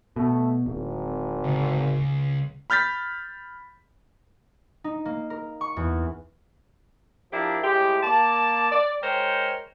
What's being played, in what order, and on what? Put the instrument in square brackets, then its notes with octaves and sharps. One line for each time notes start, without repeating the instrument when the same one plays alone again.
[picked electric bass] B2 [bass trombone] A3
[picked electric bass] D1 [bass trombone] G#1
[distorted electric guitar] C#2
[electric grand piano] B5 F6 G6 A6 B6
[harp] D#4
A#3
A#4
C#6
E2
[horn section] F3 D4 E4 G4 A#4
A2 G#3 G4
A#3 D5 A5
D5
G#3 A#4 C5 C#5 G5